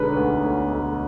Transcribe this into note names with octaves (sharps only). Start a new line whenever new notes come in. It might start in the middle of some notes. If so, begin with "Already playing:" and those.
Already playing: B1 D3 G#3 B4
D2
D2
D2